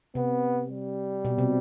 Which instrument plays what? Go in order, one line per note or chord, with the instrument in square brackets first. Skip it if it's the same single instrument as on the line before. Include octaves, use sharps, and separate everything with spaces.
[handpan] C3 [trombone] B3
[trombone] G3
[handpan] B2
C3